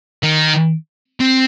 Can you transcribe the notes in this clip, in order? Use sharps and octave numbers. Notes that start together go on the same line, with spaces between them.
D#3
C4